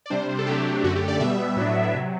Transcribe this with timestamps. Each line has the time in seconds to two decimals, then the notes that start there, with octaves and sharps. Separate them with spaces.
0.06 D5
0.10 C3 G3 D4 C5
0.39 A4
0.47 C3 F#3 A3 D4 G4
0.84 F#2 D3 A3 F#4
0.95 G4
1.08 D5
1.20 B2 G3 B3 E5
1.57 A2 F#3 B3 D4
1.94 C3 F#3